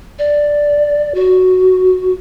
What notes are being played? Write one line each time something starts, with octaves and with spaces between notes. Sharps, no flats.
D5
F#4